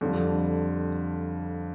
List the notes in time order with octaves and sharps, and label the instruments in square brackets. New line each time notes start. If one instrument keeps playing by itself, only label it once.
[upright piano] F2 D3 G3